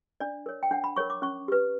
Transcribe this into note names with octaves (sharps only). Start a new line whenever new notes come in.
D4 D5
A#4 C#5
G5
D4 F#5
B5
A#4 C#5 C#6
D6
C#4 C#6
G4 B4